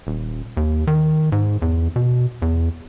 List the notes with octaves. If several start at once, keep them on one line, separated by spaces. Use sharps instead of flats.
D#1
D#2
D#3
G#2
E2
B2
E2